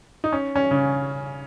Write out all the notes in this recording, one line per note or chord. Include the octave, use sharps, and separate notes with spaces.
D#4
C#4
C#4
C#3